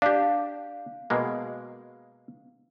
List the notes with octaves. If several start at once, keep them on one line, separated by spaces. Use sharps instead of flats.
D4 G4 F5
B2 G#3 A#3